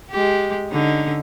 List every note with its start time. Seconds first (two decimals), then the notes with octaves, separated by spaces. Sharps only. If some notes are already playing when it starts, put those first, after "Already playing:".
0.10 G#3 G4
0.69 D3 C#4 D#4